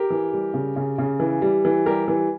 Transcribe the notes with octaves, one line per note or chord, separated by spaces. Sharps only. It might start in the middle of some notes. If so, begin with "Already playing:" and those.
Already playing: G4 A#4
E3
G3
C#3
C#3
C#3
E3
G3
E3
G3 G4 A#4
E3